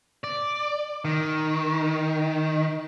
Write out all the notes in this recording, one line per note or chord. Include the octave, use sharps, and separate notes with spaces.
D5
D#3